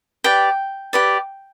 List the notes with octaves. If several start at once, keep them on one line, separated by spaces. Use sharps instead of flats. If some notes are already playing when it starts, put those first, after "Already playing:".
G4 B4 D5 G5
G4 B4 D5